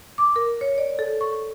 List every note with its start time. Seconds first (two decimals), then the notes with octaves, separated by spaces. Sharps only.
0.18 D6
0.36 A#4
0.61 C#5
0.78 D5
0.99 A4
1.21 C#6